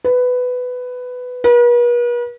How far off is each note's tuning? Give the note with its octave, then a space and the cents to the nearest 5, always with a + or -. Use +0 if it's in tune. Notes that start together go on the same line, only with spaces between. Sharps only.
B4 +10
B4 -45